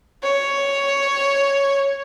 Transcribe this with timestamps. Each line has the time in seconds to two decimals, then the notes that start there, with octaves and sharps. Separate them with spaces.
0.23 C#5